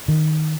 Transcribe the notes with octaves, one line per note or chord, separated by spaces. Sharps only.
D#3